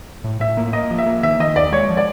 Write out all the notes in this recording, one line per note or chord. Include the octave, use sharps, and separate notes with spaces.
A2
A2 E5
A#3
A#3 D#5
F3
E5
A#3
D#3 E5
D#3 D#5
D#2 D5
G#3 C#5
F3
D5